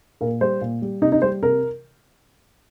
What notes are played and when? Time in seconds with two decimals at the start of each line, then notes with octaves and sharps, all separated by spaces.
0.21 A#2 A#4
0.41 G3 C5
0.61 A#2
0.82 G3
1.02 C3 D#4
1.12 D#4
1.22 G3 C5
1.43 C3 A#4